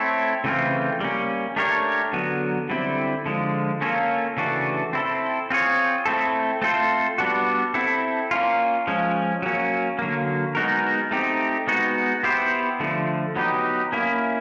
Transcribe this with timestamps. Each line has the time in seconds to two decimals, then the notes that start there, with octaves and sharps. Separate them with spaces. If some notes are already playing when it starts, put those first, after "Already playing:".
Already playing: A3 C4 E4 A4 C#5
0.44 C#3 E3 A3 C4 F4
1.00 G3 A#3 C#4
1.56 A3 D4 G4 A#4 C#5
2.13 D3 F#3 B3
2.69 D3 G3 C4 E4
3.26 D3 F3 G#3
3.81 A#3 C#4 F4 A4 C#5
4.37 C#3 E3 A3 D4 F#4
4.93 C4 E4 A4
5.50 C4 F4 G#4 C#5
6.05 A3 C4 E4 A4
6.62 A3 C4 F4 A4 C5
7.18 G3 B3 D4 F#4
7.74 C4 E4 A4
8.31 A#3 C#4 F4
8.87 F3 G#3 C#4
9.42 F#3 A#3 C#4
9.99 D3 F#3 A#3
10.55 G#3 B3 D#4 F#4 A#4
11.11 A3 C4 D#4 G4
11.67 G#3 B3 D#4 F#4
12.23 B3 E4 G4 C5
12.80 D3 F3 A3
13.36 F#3 B3 D#4 G4
13.92 A#3 C#4 E4